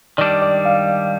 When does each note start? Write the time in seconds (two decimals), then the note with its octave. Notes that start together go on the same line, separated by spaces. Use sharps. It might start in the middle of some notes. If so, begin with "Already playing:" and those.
0.18 D#3 G3 D4 D5
0.42 D5
0.65 F5